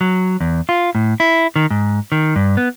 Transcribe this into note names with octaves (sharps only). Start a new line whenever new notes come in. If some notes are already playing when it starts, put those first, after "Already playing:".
F#3
E2
F4
A2
E4
D#3
G#2
D#3
G2
B3